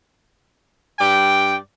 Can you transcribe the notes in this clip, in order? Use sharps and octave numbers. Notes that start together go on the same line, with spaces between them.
G2 D5 G5